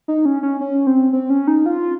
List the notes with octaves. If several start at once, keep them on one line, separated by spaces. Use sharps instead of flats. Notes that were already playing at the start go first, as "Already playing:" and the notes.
D#4
C#4
C#4
C#4
C4
C4
C#4
D#4
F4